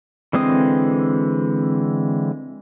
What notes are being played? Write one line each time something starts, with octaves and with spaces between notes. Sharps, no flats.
D3 E3 G#3 C4 D#6